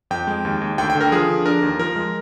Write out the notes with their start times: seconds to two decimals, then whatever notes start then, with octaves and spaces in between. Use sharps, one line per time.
0.11 F2 G5
0.27 G#3
0.45 D#2
0.61 D#2
0.78 D2 G5
0.90 G5
0.95 D3
1.01 A#4
1.12 F3 G#4
1.29 D3
1.46 D4 A#4
1.63 D#2
1.79 F3 A#4
1.96 G#3